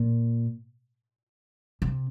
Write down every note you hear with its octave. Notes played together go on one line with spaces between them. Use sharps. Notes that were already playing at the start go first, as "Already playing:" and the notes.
Already playing: A#2
C3